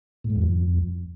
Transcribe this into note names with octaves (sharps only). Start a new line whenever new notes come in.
A2
G#2
E2
F2